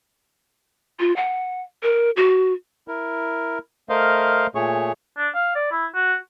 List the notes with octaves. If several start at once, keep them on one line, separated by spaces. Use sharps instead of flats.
F4
F#5
A#4
F#4
E4 A#4
A3 A#4 C5 D#5 F5
A#2 A3 G#4 C#5 C#6
D4
F5
D5
E4
F#4